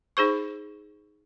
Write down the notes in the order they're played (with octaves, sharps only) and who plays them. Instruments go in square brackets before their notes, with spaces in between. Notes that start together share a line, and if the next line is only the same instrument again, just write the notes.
[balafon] D#4 G#4 C5 C#6